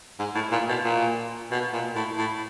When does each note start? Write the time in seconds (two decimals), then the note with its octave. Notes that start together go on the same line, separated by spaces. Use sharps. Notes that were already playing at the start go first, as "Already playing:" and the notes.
0.19 G#2
0.35 A2
0.52 A#2
0.69 B2
0.85 A#2
1.51 B2
1.73 A#2
1.95 A2
2.18 A2